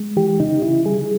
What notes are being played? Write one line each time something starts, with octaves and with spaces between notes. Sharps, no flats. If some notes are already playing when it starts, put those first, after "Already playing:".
Already playing: G#3
E3 G4
C#3 D#4
C#3 E4
G3 G#4